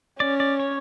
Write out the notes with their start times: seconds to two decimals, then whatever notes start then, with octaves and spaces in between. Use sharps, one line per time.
0.20 C#4 D5
0.40 D5
0.60 C#5